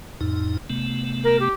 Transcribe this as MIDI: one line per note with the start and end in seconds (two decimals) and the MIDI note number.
0.21 0.57 41
0.21 0.57 45
0.21 0.57 63
0.70 1.49 48
0.70 1.49 57
0.70 1.49 59
1.24 1.36 70
1.39 1.53 67